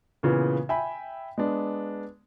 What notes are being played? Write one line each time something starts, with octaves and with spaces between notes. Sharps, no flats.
A#2 C#3 E3 B3
E5 G5 G#5 B5
G#3 B3 D4